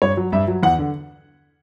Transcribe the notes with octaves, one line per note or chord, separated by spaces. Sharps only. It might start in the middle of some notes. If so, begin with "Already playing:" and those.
G2 C#5
F#3
G2 E5
F#3
E2 F#5
D3